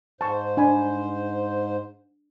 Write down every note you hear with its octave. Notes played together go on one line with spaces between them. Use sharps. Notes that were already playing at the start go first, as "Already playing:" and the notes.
G#2 C5 A5 C#6
D4 G#5 B5